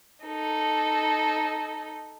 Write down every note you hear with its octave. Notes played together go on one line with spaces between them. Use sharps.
D#4 A4